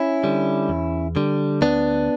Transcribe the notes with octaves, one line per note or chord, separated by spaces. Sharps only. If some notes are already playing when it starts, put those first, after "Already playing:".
Already playing: C#4 E4
D3 G3
E2
D3 G3
D2 B3 D4